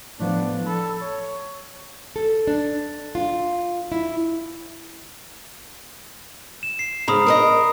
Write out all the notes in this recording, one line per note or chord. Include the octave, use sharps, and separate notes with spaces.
A2 F3 B3 D4
A4 B5
C#5
A4
D4
F4
E4
E7
C7
G#2 C#3 A#5 B5 D#6
A#4 B4 D#5